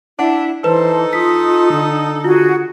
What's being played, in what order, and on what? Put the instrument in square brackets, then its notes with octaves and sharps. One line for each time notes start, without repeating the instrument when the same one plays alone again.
[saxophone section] D4 [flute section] E4 [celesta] F#5
[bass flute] E3 [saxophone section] D#4 A4 D#5 [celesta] B4 [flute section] C5 A5
[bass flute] F4 [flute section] D#6 [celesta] B6
[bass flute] D3
[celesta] F4 [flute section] F#4 G#4